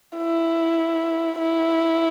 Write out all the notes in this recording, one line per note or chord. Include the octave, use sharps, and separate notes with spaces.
E4
E4